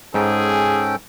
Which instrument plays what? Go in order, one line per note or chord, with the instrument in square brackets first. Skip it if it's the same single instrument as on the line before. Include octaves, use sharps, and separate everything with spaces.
[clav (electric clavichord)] G#2 [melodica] C#4 A4 G5 [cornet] G#4